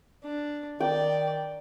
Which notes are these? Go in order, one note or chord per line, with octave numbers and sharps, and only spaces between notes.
D4
D#3 D5 G5